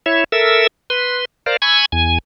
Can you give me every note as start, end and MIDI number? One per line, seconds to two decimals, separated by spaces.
0.06 0.24 64
0.06 0.24 73
0.06 0.24 76
0.32 0.67 69
0.32 0.67 70
0.32 0.67 76
0.32 0.67 88
0.90 1.25 71
0.90 1.25 84
1.46 1.57 70
1.46 1.57 72
1.46 1.57 74
1.46 1.57 77
1.62 1.85 80
1.62 1.85 83
1.62 1.85 85
1.62 1.85 88
1.62 1.85 92
1.92 2.18 40
1.92 2.18 80